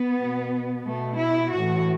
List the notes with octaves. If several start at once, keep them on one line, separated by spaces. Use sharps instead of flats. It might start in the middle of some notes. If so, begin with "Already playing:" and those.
Already playing: B3
B2
B2 A3
E4
A2 E3 F#4